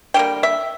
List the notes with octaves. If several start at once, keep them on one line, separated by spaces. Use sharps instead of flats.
D3 G3 A#3 G5
E5